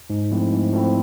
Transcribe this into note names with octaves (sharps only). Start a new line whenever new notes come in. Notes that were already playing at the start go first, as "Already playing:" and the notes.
G#2
F3 A3 C4 E4
G#2
F3 A3 C4 E4